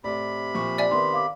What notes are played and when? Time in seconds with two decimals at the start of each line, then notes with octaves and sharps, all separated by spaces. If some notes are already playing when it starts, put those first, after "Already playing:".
0.04 A2 C3 D5 B5
0.54 A#2 F3 C#6
0.78 D5 E5 G#5
0.91 D#3 B3 C6
1.13 F5 D6